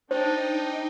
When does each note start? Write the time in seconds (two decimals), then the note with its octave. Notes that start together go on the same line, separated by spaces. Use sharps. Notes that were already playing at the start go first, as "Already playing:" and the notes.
0.11 D4 D#4 C5 G5 A5
0.49 D4 G5